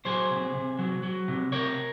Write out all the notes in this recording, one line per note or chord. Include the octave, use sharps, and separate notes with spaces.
F#3 G#4 C5
C3
C3
F#3
F#3
C3
C3 A#4 C#5